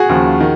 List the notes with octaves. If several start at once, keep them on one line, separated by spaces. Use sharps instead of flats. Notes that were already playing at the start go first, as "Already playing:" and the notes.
Already playing: F#4 G#4
D#2 C#3 F3
D#3